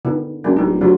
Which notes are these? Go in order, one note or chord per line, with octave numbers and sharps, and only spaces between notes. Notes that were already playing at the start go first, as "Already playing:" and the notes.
D3 D#3 B3
F#2 G#3 A#3 D4
D1 G3 D#4
D2 F#3 G3 F4